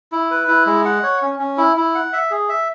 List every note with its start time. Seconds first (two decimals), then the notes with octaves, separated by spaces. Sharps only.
0.12 E4
0.31 B4
0.48 E4
0.66 G#3
0.85 F#5
1.03 C#5
1.22 C#4
1.39 C#4
1.58 E4
1.77 E4
1.95 F#5
2.13 E5
2.31 G#4
2.49 E5